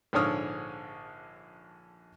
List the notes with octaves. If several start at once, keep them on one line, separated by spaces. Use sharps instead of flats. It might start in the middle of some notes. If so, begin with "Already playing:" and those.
A#1 G#2 D3 C#5 D#6 F6